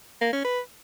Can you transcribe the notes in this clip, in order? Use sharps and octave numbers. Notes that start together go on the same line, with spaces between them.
A#3
C#4
B4